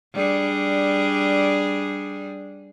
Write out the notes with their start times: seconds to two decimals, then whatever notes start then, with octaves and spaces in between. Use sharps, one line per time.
0.13 G3 D4 G#4